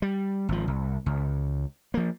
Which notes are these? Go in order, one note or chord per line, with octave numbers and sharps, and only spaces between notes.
G3
G#1 F3
C2
C#2
F3 A#3